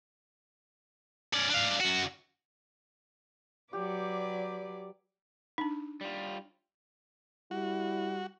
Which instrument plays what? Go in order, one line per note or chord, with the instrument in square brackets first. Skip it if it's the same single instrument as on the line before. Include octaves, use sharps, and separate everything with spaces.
[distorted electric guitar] C#4 D5
D4 F5
F#2 F#4
[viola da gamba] F#3 B4 D5 [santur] G4
[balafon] D4 D#4
[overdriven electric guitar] G3 F4
[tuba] G3 [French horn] E4 [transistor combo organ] F#4